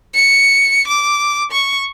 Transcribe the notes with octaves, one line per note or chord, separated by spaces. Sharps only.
C#7
D6
C#6